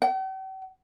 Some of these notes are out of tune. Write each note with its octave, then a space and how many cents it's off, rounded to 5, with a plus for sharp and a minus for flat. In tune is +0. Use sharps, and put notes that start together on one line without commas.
G5 -45